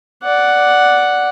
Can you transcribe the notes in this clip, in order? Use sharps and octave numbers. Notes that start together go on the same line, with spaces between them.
D5 F#5